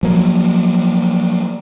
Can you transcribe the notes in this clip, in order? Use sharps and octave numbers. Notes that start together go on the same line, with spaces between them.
F3 F#3 A#3